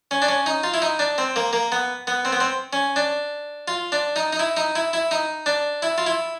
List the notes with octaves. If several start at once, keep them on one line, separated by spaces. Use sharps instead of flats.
C#4
D4
C#4
D#4
F4
E4
D#4
D4
C4
A#3
A#3
B3
B3
C4
B3
C4
C#4
D4
F4
D4
D#4
D#4
E4
D#4
E4
E4
D#4
D4
E4
F4
E4